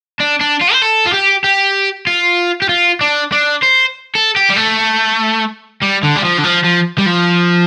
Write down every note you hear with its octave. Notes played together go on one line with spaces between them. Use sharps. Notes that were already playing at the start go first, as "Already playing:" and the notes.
D4
D4
F4
C5
A4
F4
G4
G4
F4
G4
F4
D4
D4
C5
A4
G4
G3
A3
G3
D3
G3
F3
D3
F3
F3
G3
F3